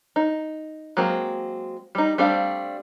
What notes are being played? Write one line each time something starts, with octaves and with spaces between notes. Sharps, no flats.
D#4
F#3 G#3 A#3 C4
G3 D#4
G3 A3 C4 D4 F5